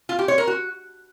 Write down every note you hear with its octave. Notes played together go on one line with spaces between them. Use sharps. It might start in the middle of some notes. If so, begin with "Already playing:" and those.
F4
G4
C#5
A#4
F#4